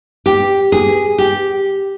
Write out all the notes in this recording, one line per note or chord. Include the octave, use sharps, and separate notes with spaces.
G4
G#4
G4